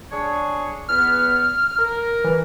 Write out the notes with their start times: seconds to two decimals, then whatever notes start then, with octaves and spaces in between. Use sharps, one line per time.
0.11 D4 G#4 C#5
0.89 E2 B3 F6
1.79 A#4
2.24 E3